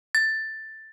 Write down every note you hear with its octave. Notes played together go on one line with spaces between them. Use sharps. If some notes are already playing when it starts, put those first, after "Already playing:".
A6